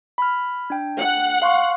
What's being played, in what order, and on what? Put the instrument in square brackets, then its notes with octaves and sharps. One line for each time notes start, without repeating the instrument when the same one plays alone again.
[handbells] B5 F6
D4 G5
[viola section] F#5
[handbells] F5 C6 C#6